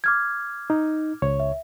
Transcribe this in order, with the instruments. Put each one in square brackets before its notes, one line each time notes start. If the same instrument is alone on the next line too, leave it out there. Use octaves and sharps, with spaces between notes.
[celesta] D6 F6 G#6
[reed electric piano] D#4
C#2 C#5
[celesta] E5